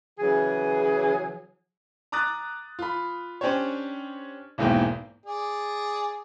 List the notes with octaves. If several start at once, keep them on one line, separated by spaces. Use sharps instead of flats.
C#3 E3 F#3 G#4
A#5 D6 D#6 F#6 A6
F4 B5
C#4 D4 G4 C5 C#5
B1 E2 G#2 A#3 G5
G#4 D5